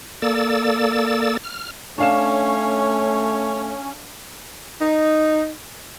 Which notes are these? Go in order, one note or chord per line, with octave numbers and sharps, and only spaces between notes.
A#3 A4 D5 E6 A6
F6
A3 C#4 D4 C#5 F5 E7
D#4